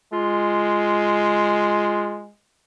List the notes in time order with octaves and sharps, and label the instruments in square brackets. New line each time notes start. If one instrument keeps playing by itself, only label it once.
[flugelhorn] G#3 [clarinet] F4